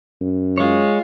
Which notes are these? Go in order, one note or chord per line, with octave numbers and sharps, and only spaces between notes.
F#2
G#3 F4 C#5